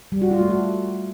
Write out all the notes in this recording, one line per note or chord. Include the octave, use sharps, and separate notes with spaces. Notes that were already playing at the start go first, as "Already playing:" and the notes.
G3
F#4
F4
A3
F#4